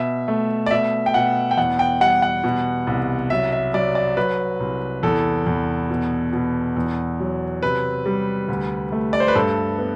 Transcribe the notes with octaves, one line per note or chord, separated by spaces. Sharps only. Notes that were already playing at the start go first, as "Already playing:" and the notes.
Already playing: B2 E5
A3
D5
B2 E5
G5
B2 F#5
G5
E2 F#5
G5
G3 F#5
F#5
B2
C2
F#3 E5
E5
F#3 D5
D5
F#3 B4
C2
E2 A4
E2
B2
B2
E2
F#3
C3 B4
G3
D2
A3
D5
C5
B4
G2 A4
B3